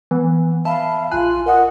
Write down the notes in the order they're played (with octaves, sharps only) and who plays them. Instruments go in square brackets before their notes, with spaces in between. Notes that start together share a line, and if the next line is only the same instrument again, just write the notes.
[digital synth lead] E3 [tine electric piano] B3
[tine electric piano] E5 B5 [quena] F5 [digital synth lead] A5
[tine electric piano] A#1 F#6 [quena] F4 [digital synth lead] G#5
[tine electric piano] A#4 D#5 D#6 [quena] F#5